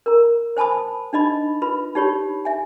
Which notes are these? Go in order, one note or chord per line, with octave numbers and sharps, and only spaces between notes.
A#4 A#5
C5 G#5 A5 B5 D#6
D4 D#4 D#5 B5
F4 B4 B5
D#4 G4 C#5 B5
E5 G#5